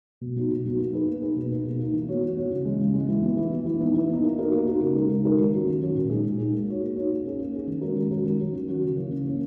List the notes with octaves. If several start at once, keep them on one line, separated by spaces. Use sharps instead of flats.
B2
F#3 B3 D#4 F#4
B2
F#3 B3 D#4 F#4
A#3
D#4 G#4 B4
A#3
D#4 G#4 B4
B2
A#3 D#4
B2
A#3 D#4
E3
B3 F#4 C#5
E3
B3 F#4 C#5
C#3
E3 G#3
C#3
E3 G#3
E3
B3 E4
E3
B3 E4
E3
B3 D#4
E3
B3 D#4
A#3
D#4 F#4 A#4
A#3
D#4 F#4 A#4
C#3
G#3 D#4 A#4
C#3
G#3 D#4 A#4
D#3
F#3 A#3 C#4 F#4
D#3
F#3 A#3 C#4 F#4
A#2
G#3 D#4 G#4
A#2
G#3 D#4 G#4
A#3
D#4 F#4 C#5
A#3
D#4 F#4 C#5
A#3
C#4 G#4
A#3
C#4 G#4
D#3
G#3 C#4 F#4 A#4
D#3
G#3 C#4 F#4 A#4
D#3
F#3 C#4 F#4
D#3
F#3 C#4 F#4
C#3
E3 A#3 C#4
C#3
E3 A#3 C#4